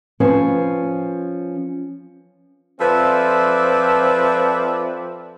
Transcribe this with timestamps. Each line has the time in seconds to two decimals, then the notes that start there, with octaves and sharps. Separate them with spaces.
0.20 F3 C#4 B4 C5
2.80 F3 C4 A4 B4 D5 E5